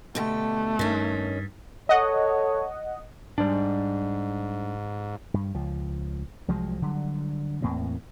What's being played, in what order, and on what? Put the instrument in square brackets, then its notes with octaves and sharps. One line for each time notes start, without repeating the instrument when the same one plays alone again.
[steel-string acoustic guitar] B2 D3 G4 [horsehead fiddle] A3
[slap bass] G2 [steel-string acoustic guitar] D#3 C#4
[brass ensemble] A4 C#5 [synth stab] D#5 F#5
[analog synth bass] G#2 [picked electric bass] G3 D4
[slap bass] G2
C#2 F3
C2 F3 F#3 G#3
D3 F#3 G3
E2 A2 A#3 C4